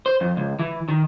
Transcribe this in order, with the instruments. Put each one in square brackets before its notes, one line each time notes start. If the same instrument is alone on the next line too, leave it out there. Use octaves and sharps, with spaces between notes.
[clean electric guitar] C5
F2
C#2
E3
D#3